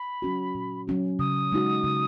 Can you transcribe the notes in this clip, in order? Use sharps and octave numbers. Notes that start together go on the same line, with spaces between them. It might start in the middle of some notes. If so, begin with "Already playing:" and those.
Already playing: B5
F#3 C#4 F#4
A#2
F#3 C#4 F#4
C#3 D#6
G#3 D#4 F#4
C#3